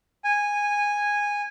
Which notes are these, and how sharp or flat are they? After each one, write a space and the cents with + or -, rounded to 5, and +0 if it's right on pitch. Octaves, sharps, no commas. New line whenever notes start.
G#5 -10